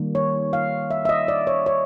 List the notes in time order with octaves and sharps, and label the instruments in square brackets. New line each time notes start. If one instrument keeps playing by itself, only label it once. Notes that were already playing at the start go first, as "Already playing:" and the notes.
Already playing: [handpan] D#3 G3 A#3
C#5
F5
E5
E5
D#5
D5
C#5
C#5